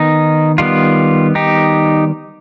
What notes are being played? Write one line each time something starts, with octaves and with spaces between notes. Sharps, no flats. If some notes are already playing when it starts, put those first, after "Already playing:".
Already playing: D#3 B3 D#4
D#3 G3 B3 F4
D#4 G4